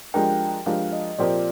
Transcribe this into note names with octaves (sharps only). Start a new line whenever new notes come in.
F3 G#3 D4 G4 A#4 G5
F3 G#3 D4 G4 A#4 F5
D#5
A#2 F3 C4 G4 A#4 D5